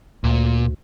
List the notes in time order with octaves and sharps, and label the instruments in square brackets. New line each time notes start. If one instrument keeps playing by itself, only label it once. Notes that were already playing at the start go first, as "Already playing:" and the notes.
[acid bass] D2 [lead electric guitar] A#2